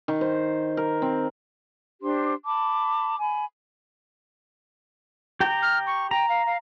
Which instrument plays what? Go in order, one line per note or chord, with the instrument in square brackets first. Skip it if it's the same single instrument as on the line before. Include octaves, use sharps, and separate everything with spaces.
[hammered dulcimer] D#3
C5
A#4
C4
[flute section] D4 G4 C5 C6
A5 B5 D6
G#5 B5
[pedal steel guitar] G4 G5 A#5
[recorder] F6
C#6
[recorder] G5 [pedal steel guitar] A#5
[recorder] F5
F5